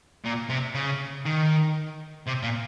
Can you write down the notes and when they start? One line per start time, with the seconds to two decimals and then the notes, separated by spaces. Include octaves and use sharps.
0.24 A#2
0.50 C3
0.75 C#3
1.26 D#3
2.26 C3
2.42 A#2